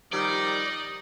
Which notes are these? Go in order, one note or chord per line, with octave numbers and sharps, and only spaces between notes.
D#3 F3 G3 D#4 D5